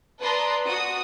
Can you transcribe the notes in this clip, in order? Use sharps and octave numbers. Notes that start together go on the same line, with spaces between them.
B4 D5 A5 A#5 C6 D#6
F#4 D#6